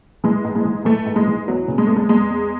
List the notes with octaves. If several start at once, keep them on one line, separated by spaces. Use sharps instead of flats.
E3 G#3
G#2
G#3
E3
E3 A3
G#2
G#3
E3
E2 F#3
C#3
G#3
E2 A3
G#3
E2 G#3
E2